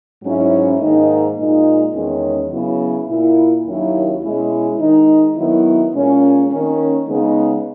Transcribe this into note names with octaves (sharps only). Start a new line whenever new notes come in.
G#2 F#3 C#4 E4
G#2 D#3 A#3 D#4
A#2 G#3 D#4
E2 D#3 G#3 C#4
C#3 F#3 B3 E4
A#2 A#3 E4
D#2 D#3 F#3 C#4 E4
B2 G#3 C#4 E4
D#3 G#3 D#4
D#3 F#3 B3 E4
A#2 G#3 C#4
D#3 A#3 C#4
C#3 G#3 B3 D#4